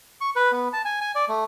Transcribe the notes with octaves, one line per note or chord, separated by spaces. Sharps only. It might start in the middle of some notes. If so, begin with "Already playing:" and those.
C#6
B4
B3
A5
G#5
G#5
D5
A3